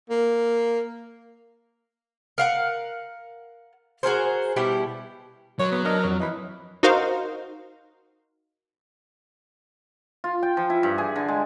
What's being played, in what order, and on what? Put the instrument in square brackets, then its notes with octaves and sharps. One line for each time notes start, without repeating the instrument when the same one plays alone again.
[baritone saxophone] A#3
[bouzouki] A#4 F5 F#5
F#4 G#4 A#4 C5
B2 G3 E4 G4
[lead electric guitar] F#3 [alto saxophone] C#5
[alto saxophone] B3
[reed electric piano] D4 D#5 A5 [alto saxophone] A#4
[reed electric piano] F2 C#5 F6
[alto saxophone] E3 [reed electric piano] D#5 B5
[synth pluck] D#4 F#4 A#4 C5 F5
[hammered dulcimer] F4
G5
F3
E4
G2
G#4
D3
G#3